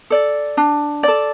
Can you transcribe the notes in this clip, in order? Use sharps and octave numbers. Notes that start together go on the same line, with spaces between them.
A4 D5
D4
A4 D5